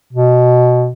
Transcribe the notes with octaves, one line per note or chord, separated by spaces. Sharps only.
B2